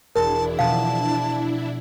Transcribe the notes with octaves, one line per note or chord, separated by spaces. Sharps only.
E1 D4 E4 A#4 A5
B2 F3 F5 A5